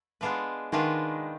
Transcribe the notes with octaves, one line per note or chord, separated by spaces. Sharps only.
G#3 B3 D4 F4 B4
D#3 G#3 B3 D4 F4 B4